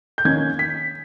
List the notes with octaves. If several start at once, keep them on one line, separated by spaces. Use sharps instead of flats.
G6
D#3 A#3 C#4 G#6
B6